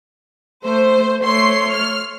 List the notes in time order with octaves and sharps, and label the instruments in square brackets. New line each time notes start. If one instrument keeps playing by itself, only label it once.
[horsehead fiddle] A3 [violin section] C5
[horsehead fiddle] A3 C#5 [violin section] C6 C7
[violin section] F6